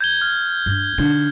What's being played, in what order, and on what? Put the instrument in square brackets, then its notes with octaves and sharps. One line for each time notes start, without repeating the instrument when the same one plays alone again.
[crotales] G6 G#6 G7
F6
[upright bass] G2
D3 D#4